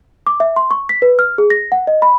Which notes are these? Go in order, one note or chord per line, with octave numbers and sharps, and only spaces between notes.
D6
E5
C6
C#6
B6
B4
F6
G#4
A#6
F#5
D#5
B5